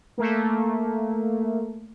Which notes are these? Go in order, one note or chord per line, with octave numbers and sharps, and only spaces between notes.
A3 A#3